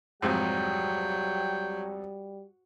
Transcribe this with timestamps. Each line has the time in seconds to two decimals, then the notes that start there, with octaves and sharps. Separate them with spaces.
0.22 F2 G#2 C3 F#3 G3 G5